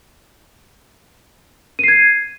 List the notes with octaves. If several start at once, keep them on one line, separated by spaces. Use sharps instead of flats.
G#6 C7 D#7